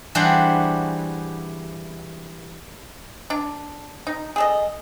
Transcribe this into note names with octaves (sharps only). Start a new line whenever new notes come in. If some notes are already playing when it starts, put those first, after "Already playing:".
E3 G3 D4 F#4 G#4 C5
D4
D#4
G#4 A4 D#5